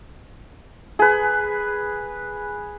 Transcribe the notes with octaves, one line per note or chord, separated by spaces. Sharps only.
G#4 B4